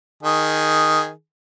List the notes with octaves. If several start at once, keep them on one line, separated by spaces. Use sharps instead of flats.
D#3 G#4